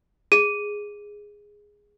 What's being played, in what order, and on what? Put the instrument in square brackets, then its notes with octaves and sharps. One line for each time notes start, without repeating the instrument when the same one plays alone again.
[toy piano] G#4 [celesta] D#7